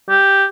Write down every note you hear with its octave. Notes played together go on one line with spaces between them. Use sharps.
G4